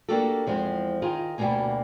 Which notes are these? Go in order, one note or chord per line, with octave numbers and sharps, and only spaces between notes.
A#3 D4 F#4 G4 A4
E2 F3 G#3 C4
D#3 D#4 F4 G#4
D2 B2 G3 A3 A#3 G#5